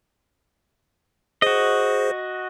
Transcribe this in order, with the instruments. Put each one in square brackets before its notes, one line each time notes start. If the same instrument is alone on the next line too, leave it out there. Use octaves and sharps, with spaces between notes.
[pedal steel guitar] F#4 D#5 [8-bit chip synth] G#4 C5